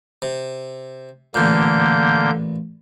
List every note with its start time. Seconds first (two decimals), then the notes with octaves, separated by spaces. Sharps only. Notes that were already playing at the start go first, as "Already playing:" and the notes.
0.22 C3
1.34 A1 A#2 D3 A#3 G6